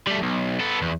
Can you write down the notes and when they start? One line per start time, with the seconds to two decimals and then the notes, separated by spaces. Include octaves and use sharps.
0.07 G3 A3
0.22 B1
0.60 B3 A4
0.82 E2